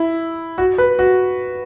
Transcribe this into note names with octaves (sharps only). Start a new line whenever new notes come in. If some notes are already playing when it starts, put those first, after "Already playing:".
Already playing: E4
F#4
B4
F#4